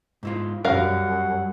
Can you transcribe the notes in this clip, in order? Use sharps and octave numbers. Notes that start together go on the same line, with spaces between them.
G#2 E4 F4
F#2 G3 C#4 A#4 F5 F#5